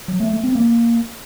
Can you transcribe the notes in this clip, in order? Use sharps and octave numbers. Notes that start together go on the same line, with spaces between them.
F#3
A3
A3
C4
A#3